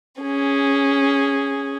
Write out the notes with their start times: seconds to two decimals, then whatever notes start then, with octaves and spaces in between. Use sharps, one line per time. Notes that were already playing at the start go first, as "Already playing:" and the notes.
0.21 C#4 G#4